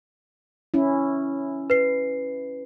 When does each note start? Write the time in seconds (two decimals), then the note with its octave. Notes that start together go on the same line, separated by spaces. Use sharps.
0.74 C#4 E4
1.70 B4 C7